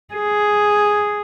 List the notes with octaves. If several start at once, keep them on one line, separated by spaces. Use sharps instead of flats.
G#4